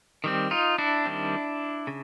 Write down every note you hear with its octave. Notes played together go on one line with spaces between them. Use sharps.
D#3 G3 C4
D#4 F4
D4 E4
D#3 G3 C4
C#3